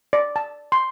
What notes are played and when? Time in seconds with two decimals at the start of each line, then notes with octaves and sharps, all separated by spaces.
0.13 D5
0.36 A5
0.72 C6